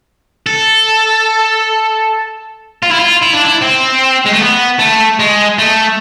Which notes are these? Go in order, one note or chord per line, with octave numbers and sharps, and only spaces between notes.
A4
F4
E4
F4
E4
D4
E4
C4
G#3
A3
B3
A3
G#3
A3